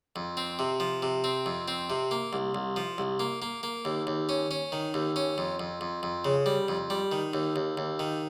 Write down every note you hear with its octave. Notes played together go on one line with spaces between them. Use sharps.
F2
C4
C3
F3
C3
C4
F2
C4
C3
A#3
C2
C2
F3
C2
A#3
A#3
A#3
D#2
D#2
C#4
C#4
D#3
D#2
C#4
F2
F2
F2
F2
C#3
G3
F2
G3
D#3
D#2
D#2
D#2
D#3